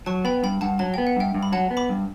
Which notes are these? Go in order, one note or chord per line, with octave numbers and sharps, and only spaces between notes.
F#3 A5 C#6
B3 G5 B5
G2 G5 B5
G2 F#5 A5
F#3 A5
B3 G5
F#5
G2 E5 G5
G2
B5
F#3 F#5 A5
B3
B5 D6
G2